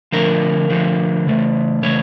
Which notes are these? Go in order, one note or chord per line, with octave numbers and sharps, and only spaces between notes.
D3 F3 A3 A#4
D3 F3 A3
C#3 E3 A3
C#3 E3 A3 C#5